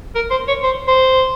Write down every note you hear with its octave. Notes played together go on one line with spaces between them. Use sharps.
A#4
C5
C#5
C5
C5